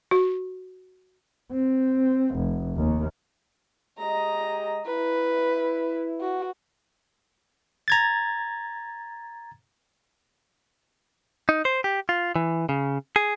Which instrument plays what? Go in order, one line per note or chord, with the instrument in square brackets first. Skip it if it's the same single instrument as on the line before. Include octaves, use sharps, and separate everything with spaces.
[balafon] F#4
[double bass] C4
F1
D#2
[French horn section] G#3 G4 D#5 [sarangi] A#5
[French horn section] E4 [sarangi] B4
[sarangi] F#4
[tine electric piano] A#5 G#6 A6
[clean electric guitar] D#4
C5
G4
F4
E3
C#3
G#4